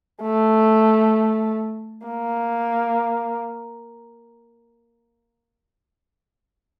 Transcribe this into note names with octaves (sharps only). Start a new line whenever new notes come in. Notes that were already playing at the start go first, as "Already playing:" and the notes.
A3
A#3